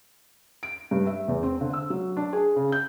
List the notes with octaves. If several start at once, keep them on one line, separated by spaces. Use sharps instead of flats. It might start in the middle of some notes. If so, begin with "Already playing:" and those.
D7
G2
E5
E2
C4
D3
E6
F#3
D4
G#4
C#3
G6